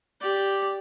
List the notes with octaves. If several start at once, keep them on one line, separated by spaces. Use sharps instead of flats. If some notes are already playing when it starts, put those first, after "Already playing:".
G4 D5